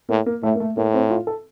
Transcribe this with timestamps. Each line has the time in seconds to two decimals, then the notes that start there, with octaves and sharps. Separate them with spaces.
0.09 A2 A#3
0.26 A#3
0.42 A2 A3
0.55 A#3
0.60 A3
0.77 A2 A#3
0.94 C4
1.10 F4
1.27 A4